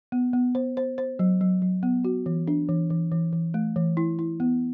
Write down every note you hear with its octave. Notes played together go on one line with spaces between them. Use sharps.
B3
B3
C5
C5
C5
F#3
F#3
F#3
B3
F#4
E3
D4
E3
E3
E3
E3
A3
E3
E4
E4
B3